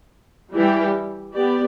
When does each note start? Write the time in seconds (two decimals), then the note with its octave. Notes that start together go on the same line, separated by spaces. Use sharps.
0.55 E3 G3 E4 G4
1.34 B3 G4 D5